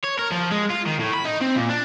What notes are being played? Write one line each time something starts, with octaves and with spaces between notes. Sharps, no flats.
C#5
A#4
F3
G#3
F4
D#3
A2
B5
D#4
C4
A#2
D4